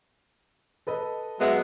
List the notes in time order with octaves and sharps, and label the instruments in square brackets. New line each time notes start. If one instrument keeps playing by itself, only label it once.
[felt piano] A4 B4 D#5
[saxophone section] F#3 G#3 E5 [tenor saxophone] B3